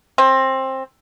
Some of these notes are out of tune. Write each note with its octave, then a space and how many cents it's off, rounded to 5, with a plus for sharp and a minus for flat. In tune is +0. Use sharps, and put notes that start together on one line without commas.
C4 +20